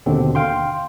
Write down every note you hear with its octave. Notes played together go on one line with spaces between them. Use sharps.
D#2 B2 D3 C4
F5 G5 C6